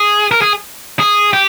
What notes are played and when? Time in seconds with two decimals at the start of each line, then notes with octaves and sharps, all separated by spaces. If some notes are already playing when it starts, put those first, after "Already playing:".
Already playing: G#4
0.31 A#4
0.42 G#4
0.99 G#4
1.33 G4